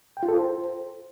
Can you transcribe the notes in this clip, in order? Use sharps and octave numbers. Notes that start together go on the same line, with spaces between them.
G5
F4
A4
C5